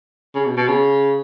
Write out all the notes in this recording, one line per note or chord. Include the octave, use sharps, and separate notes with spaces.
C#3
B2
B2
C#3